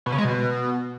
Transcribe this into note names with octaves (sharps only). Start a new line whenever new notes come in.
B2
C#3
G#3
B2